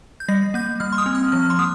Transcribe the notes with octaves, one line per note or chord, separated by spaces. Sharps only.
G6
G3 A#6
A#3 G6
G3 F6
C6
D#6
C4
F6
F3 F6
C6
A#3 D#6